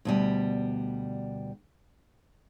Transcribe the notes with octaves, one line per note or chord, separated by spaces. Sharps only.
D2 B2 G3